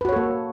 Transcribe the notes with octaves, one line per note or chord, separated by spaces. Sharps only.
A#3 F#4 A4 B4 C#5